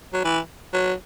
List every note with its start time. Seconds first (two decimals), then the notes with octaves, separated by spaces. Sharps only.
0.13 F#3
0.25 E3
0.74 F#3